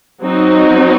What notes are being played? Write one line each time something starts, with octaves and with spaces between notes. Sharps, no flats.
F#3 C4 D#4